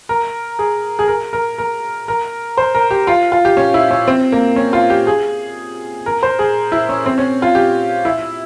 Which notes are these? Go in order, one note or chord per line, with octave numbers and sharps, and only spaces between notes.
A#4
G#4
G#4
A#4
A#4
A#4
A#4
C5
A#4
G4
F4
F4
G4
C#4
E4
C#4
C4
A#3
C#4
F4
G4
G#4
A#4
C5
G#4
E4
C#4
C4
C#4
F4
G4
E4